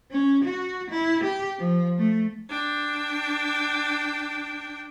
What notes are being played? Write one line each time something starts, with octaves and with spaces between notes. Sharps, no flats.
C#4
F#4
E4
G4
F3
A3
D4 G5